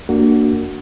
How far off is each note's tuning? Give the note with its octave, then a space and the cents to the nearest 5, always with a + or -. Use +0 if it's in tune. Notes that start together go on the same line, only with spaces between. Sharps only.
A#3 -20 D4 +0 F#4 +0